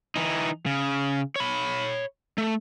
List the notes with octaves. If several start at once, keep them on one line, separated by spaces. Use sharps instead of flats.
E3 D#4
C#3
C#5 B5
A3